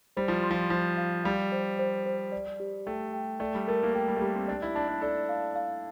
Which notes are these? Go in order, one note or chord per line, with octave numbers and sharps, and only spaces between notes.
G3 C5
F3
C6
F3
F3 C6
F5
G3 F5
C5
C5
C5
D5
G4
A3 G5
G5
A3 D5
G3
A3 A#4
A#3
A3 G5
G3
A3
G3 G4
C4
D4 D5
E4
D4 A5
D4
A4 D5
F5
F5